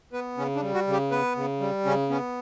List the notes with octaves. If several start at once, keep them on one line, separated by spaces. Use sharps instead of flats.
B3 B4
C#3 C#4
D4
G3
F#4
C#3
G4
B3 B4
C#3
G3
C#3 C#4
B3 C#4